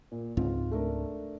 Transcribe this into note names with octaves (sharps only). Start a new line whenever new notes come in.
A#2
C#2 G#2 C4 F4
A3 D4 A#4